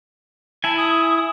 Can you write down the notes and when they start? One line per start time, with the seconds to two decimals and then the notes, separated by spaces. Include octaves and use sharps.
0.64 E4 G#5 A5
0.77 D#6